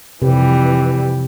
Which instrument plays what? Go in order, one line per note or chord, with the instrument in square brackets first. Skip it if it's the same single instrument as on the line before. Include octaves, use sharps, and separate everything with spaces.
[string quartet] F2 E3 G3 [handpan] C3